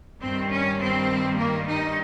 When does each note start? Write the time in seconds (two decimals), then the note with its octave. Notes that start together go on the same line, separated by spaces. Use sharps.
0.21 G2 D#3 G3 C4
0.49 C#4
0.79 C4
1.37 A#3
1.66 D#4